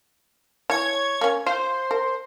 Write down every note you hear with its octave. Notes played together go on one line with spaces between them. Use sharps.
E3 C#5 G#6
A#3 C#4
F4 C5
A#4